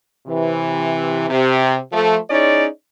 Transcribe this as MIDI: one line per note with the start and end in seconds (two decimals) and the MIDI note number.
0.27 1.28 48
0.27 1.28 52
1.30 1.76 48
1.92 2.17 53
1.92 2.17 57
2.30 2.66 61
2.30 2.66 63
2.30 2.66 64
2.30 2.66 68
2.30 2.66 73
2.30 2.66 74